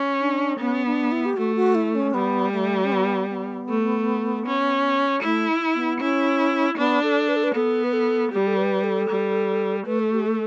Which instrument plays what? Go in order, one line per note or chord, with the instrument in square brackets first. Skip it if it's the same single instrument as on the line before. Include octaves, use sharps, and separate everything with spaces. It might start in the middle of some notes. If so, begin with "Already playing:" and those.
Already playing: [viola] C#4
[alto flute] D4
[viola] B3 [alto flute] C#4
[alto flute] D4
E4
G4
[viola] A3 [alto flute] F#4
[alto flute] F#4
E4
C#4
[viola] G3 [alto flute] B3
[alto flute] A3
C#4
B3
B3
[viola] A3
C#4
[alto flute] A3 [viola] E4
[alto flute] B3
[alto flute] C#4 [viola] E4
[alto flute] B3 [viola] D4
[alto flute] A4
B4
A4
B4
[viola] B3 [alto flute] A4
[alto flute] B4
A4
[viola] G3 [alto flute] G4
[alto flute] A4
B4
A4
[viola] G3
[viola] A3 [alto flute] B4
[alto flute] A4
G4
A4